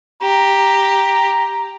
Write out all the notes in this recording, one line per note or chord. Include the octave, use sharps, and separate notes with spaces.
G4 A#5